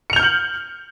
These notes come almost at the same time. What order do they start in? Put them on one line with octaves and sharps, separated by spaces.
C#7 F7 G6 F6 F#7